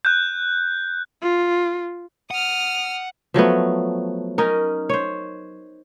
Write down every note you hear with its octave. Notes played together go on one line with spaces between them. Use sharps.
F#6 G6
F4
F#5 D#6 F6
F3 F#3 A3 B3
C#4 D#4 A#4
C5 C#5